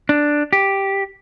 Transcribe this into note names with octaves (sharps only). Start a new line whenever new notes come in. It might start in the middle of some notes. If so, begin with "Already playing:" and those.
D4
G4